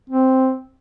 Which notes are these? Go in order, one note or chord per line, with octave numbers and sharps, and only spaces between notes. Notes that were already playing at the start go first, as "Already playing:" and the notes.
C4